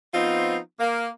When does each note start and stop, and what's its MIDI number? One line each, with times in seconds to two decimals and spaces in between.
0.14 0.58 53
0.14 0.58 59
0.14 0.58 60
0.14 0.58 63
0.14 0.58 65
0.80 1.08 58